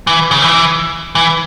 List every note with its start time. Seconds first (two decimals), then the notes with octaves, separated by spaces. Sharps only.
0.07 E3
0.31 C#3
0.42 E3
1.15 E3